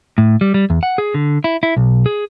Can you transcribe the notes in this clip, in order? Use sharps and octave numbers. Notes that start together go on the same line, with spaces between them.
A2
G3
G3
E2
F#5
G#4
D3
E4
E4
B1
G#4